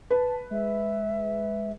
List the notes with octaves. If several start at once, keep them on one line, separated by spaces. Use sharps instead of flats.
B4 A5
G#3 E5